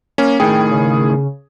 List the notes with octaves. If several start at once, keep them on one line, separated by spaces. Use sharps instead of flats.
A#3 C#4
A2 D#3 G#4 G5
C#3